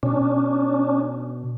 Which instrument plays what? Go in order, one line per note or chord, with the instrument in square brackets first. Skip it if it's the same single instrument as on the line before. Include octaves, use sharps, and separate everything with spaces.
[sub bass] B2 [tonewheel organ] C#4 D4